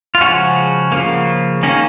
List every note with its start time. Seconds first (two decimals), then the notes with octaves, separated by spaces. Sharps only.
0.15 F4
0.21 C#3 F3 G#3 C#4 F#4
0.92 C#3 F3 A#3
1.63 D#3 A#3 C#4